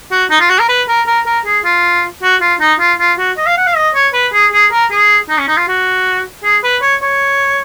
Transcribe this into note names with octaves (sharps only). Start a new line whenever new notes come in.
F#4
D#4
F4
F#4
A#4
B4
A#4
A#4
A#4
G#4
F4
F#4
F4
D#4
F4
F4
F#4
D#5
F5
F#5
F5
D#5
C#5
B4
G#4
G#4
A#4
G#4
D#4
C#4
D#4
F4
F#4
G#4
B4
C#5
C#5